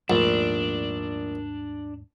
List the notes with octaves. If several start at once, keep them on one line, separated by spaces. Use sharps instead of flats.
A#1 D#2 G#2 A3 D4